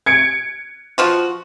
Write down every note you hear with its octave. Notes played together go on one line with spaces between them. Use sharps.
G#6 C#7 D7
F3 F4 F#4